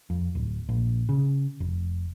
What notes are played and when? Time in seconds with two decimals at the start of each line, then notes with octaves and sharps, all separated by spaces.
0.10 F2
0.35 D1
0.69 A#1
1.09 C#3
1.60 F1